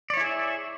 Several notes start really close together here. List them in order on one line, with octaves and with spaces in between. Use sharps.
D5 C#5 E4 G#4 E5